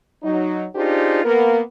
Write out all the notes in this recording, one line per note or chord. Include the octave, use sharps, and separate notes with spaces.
F#3 D#4
D4 D#4 F4 G4 G#4 C5
A#3 B3 A#4